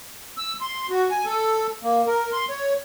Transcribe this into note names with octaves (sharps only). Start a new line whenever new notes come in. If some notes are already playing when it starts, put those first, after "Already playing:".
E6
C6
F#4
G#5
A4
A#3
A#4
C6
C#5